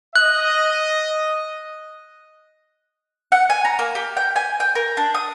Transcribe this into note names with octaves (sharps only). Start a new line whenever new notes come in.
D#5 F#6
F#5
G#5
A#5
A#3
G4
G5
G#5
G5
A#4
D4
D#6